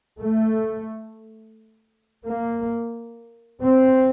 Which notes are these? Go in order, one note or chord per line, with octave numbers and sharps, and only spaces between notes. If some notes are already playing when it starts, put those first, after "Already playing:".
A3
A#3
C4